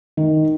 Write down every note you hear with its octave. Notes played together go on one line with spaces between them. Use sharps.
D#3